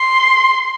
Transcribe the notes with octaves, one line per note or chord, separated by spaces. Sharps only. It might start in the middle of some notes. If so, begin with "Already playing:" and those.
Already playing: C6